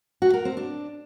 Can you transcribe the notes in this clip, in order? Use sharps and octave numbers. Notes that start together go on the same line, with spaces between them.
F#4
A#4
C4
D4